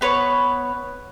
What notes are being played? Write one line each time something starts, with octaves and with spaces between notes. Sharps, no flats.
B3 B4 C#5